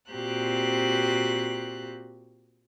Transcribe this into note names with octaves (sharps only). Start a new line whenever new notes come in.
A#2 C4 F#4 G4 F#6